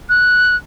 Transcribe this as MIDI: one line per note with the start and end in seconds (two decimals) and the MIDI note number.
0.09 0.56 90